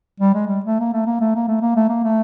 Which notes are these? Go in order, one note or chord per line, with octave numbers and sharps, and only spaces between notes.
G3
G#3
G3
A3
A#3
A3
A#3
A3
A#3
A3
A#3
A3
A#3
A3